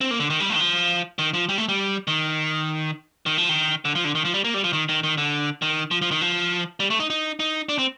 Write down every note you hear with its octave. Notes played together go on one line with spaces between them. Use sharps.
C4
A#3
D3
D#3
G3
A3
D#3
F3
D#3
F3
G3
A3
G3
D#3
D#3
F3
D#3
D3
F3
D3
D#3
F3
G3
A#3
G3
F3
D#3
D#3
D#3
D3
D#3
F3
F3
D#3
F3
G3
A3
D#4
D#4
D#4
D4
C4